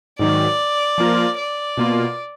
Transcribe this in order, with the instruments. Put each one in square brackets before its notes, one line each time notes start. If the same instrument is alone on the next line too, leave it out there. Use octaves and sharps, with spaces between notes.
[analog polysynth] G#2 D#3 F#3 [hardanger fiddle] D5
[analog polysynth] F3 A#3 F4 A#4
[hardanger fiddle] D5
[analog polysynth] B2 A#3 F4